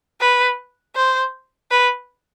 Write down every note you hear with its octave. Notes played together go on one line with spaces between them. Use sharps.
B4
C5
B4